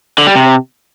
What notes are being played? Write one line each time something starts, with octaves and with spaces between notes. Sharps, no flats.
D3
G3
C3